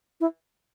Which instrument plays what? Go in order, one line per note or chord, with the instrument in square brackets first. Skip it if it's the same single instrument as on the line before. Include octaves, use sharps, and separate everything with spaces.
[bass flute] E4